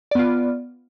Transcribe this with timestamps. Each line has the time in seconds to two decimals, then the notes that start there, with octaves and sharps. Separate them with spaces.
0.11 D5
0.15 B3
0.19 F4